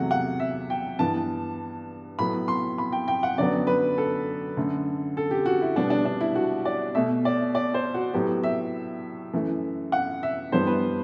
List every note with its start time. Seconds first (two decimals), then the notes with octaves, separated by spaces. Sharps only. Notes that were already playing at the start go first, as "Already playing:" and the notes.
Already playing: E2 C3 F#3 A3 F#5
0.11 F#5
0.40 E5
0.70 G5
0.99 G2 E3 B3 A5
2.19 A2 F#3 B3 B5
2.48 C6
2.78 B5
2.93 G5
3.08 G5
3.23 F#5
3.37 F#2 D3 F#3 B3 D5
3.67 B4
3.98 A4
4.57 F#2 D3 A3
5.17 A4
5.31 G4
5.46 F#4
5.62 E4
5.76 B2 G3 B3 D4
5.90 D4
6.05 D4
6.21 E4
6.35 F#4
6.65 D5
6.95 B2 A3 E5
7.25 D5
7.55 D5
7.74 C5
7.94 F#4
8.13 A2 F#3 B3 G4
8.44 E5
9.33 F#2 E3 A3
9.92 F#5
10.23 E5
10.52 G2 E3 G3 B3 C5
10.67 B4